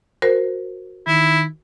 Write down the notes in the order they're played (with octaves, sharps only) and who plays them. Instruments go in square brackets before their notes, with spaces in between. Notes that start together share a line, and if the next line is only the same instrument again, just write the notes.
[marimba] F#4 A#4 C5
[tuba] D#3 [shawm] E4